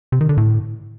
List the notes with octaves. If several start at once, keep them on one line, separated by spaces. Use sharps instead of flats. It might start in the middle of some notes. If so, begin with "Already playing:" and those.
C3
D#3
D3
A2